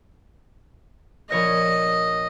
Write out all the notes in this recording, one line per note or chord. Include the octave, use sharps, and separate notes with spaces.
A#1 C#5 D#5 A#6